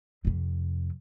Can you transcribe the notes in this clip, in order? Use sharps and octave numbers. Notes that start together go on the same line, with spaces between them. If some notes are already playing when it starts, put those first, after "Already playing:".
F2 C3